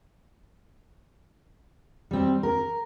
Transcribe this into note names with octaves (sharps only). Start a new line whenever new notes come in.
G3 C4
A#4